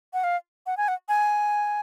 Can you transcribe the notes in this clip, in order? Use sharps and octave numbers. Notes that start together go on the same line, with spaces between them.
F#5
F5
F#5
G#5
F#5
G#5